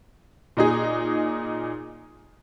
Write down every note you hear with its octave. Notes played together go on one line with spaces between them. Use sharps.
A#2 D#4 G#4